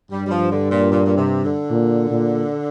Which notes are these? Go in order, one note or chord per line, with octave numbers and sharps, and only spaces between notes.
G2 G3
G3
F3
D3
A#2
A#2
A#2
C3
D3
A#2
A#2